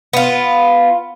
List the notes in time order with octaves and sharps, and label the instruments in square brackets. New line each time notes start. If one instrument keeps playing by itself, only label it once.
[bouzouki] B3 F4